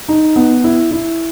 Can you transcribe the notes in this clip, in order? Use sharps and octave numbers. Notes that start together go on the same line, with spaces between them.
D#4
B3
E4
E4